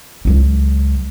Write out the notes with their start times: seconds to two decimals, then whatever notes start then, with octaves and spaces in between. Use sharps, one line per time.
0.25 C#2 F#3